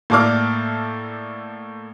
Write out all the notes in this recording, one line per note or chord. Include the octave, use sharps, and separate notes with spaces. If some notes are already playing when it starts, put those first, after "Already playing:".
A2 A#3 A4 D5 D6 F6